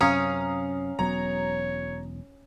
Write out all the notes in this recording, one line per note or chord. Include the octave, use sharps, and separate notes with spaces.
F#2 C3 C#4 F5 A#5 D#6
E1 F#3 B3 C#5 A#5